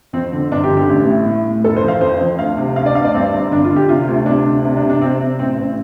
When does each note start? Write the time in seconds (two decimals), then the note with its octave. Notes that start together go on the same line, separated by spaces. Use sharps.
0.13 F2 C4
0.33 D3
0.51 G1 D4
0.64 G4
0.69 D3
0.77 G4
0.89 A1
1.07 A2
1.26 A2
1.45 A2
1.64 F1 A4
1.76 C5
1.83 F2
1.88 F5
2.01 F2 C5
2.20 F2
2.39 D2 F5
2.57 C3
2.76 D2 F5
2.86 D5
2.95 D2 F5
3.05 D5
3.14 G2 C4
3.33 G1
3.51 D3 D4
3.64 F4
3.70 D3
3.76 G4
3.89 C3 F4
4.07 D2
4.26 C3 D4
4.46 D2
4.65 C3
4.77 D4
4.83 C3
4.90 D4
5.01 C3 C4
5.20 C3
5.39 A1 C4
5.58 A1